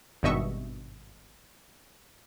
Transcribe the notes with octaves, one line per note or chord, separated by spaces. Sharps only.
G#1 G2 B2 D#5 E5 C#6